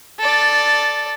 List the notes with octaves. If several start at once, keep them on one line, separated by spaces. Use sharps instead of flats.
A4 D5